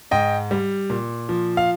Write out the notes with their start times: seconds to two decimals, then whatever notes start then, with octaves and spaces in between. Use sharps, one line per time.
0.11 G#2 D#5 G5
0.51 G3
0.90 A#2
1.29 F3
1.57 F5